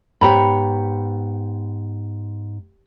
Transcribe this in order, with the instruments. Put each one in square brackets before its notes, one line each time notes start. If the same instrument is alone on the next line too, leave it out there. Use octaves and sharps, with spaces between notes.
[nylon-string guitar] G#2 B3 C#5 [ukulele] G4 A#5 B5